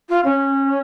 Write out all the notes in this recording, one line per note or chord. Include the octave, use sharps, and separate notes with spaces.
F4
C#4